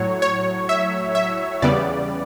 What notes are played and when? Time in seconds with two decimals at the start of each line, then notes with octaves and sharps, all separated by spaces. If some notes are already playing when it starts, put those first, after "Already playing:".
Already playing: A2 F#3 C#5
0.22 C#5
0.69 E5
1.15 E5
1.62 E2 C#3 G3 B3 D5